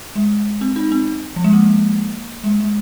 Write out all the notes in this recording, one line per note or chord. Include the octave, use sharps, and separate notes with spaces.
G#3
C4
D#4
C4
F3
G#3
A#3
G#3
G#3